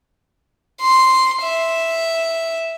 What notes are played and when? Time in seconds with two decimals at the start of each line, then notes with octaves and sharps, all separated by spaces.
0.81 C6
1.43 E5